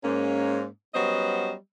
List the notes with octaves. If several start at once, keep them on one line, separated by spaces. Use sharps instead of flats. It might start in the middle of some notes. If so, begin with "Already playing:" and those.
G#2 A#3 C#4
F#3 G3 B3 C#4 C5 D#5